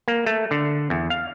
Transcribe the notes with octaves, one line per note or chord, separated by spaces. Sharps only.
A#3
A3
D3
E2
F5